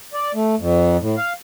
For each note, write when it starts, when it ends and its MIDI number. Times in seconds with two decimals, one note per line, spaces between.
0.13 0.32 74
0.34 0.55 57
0.59 0.97 41
1.01 1.15 45
1.17 1.33 77